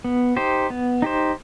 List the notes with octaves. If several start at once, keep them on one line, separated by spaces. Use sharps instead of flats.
B3
D#4 G4 C5
B3
D#4 G4 C5